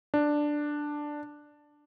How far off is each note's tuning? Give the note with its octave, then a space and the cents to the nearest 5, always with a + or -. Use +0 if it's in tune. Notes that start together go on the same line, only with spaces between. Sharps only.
D4 +5